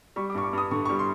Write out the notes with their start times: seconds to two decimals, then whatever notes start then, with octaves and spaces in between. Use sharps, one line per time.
0.16 G3 C#6
0.30 D6
0.35 G2 C#6
0.44 D6
0.53 G2 D#6
0.71 D3 C#6
0.86 C#6
0.89 G3
0.99 C6